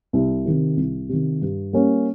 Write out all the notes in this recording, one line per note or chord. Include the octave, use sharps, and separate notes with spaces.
C2
C3 D#3
C2
C3 D#3
G2
G3 A#3 C#4